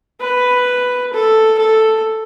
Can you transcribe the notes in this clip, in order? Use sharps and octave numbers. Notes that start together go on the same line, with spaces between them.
B4
A4
A4